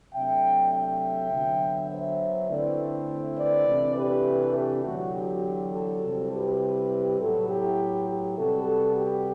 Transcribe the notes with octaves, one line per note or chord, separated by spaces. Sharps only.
C3 F#3 A3 D4 E5 G5
E5 G5
D3 F#3 B3
C5 E5
D3 A3 C4 E4 B4 D5
B4 D5
C3 E3 A3 D4
G4 B4
G4
E2 D3 F#3 F#4
G4
F#4 A4
C3 G3 C4 E4
G4 B4
A2 F#3 B3 E4 F#4 A4
G4
G4
C3 G3 B3 F#4 A4
G4